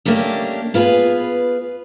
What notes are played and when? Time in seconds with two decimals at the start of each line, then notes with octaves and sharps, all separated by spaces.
0.05 A3 A#3 C#4 D4 G4
0.74 B3 F4 G#4 B4